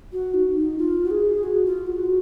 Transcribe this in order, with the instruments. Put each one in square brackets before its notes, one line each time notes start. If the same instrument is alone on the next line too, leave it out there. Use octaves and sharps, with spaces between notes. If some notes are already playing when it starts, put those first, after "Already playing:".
[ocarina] F#4
D#4
D#4
F4
F#4
G#4
F#4
F4
F#4